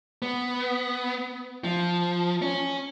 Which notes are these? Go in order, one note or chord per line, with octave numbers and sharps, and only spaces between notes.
B3
F3
C#4